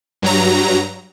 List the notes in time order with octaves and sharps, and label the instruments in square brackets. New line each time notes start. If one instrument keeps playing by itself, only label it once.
[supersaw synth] G2 F#3 A#5